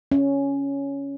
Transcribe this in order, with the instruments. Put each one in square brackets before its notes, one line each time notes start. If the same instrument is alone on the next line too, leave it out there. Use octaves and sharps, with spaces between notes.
[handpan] C#4